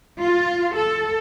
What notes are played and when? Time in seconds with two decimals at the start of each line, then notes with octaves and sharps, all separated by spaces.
0.21 F4
0.76 A4